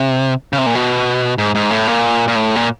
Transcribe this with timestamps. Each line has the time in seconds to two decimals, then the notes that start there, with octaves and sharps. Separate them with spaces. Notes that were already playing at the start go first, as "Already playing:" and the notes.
Already playing: C3
0.53 C#3
0.58 C3
0.66 A#2
0.75 B2
1.38 G#2
1.55 G#2
1.71 A2
1.87 A#2
2.28 A#2
2.36 A2
2.56 A#2